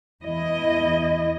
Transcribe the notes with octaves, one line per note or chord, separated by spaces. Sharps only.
E2 E4 D#5